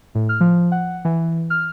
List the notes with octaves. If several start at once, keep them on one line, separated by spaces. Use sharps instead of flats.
A2
F6
F3
F#5
E3
F6